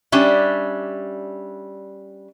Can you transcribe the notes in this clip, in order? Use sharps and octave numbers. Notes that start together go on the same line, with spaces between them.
G3 C#4 D4 E5